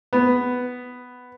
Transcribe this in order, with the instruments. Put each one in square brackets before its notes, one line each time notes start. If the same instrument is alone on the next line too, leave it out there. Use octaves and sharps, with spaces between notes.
[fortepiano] B3